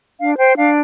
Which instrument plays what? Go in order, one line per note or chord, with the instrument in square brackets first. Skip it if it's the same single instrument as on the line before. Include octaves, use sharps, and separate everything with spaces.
[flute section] D4 F5
C5 G5
D4 F5